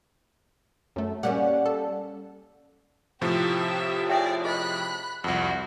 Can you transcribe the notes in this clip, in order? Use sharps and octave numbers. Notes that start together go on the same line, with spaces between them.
F#2 A3
G3 A#3 C#4 F#5
A4
A2 C3 F3 G4 E5
G#4 C#5 D5 E5 G5
G#4 D#5 B5 F#6
C2 F2 F#4